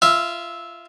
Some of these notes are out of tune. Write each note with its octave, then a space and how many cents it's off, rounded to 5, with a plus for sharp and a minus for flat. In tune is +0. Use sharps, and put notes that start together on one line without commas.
F4 -25 E5 -10